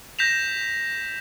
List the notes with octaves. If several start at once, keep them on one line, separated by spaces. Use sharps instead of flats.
G6 A#6 B6 E7 F7